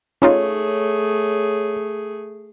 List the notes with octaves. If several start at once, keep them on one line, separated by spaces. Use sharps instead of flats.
A3 C#4 D#4 F4 G#4 C#5